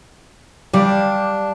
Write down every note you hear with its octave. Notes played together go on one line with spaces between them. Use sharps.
G3 D4 G4 F5